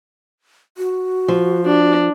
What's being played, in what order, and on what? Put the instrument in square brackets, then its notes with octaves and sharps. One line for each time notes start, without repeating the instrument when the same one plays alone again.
[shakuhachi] F#4
[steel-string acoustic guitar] F3
[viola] D4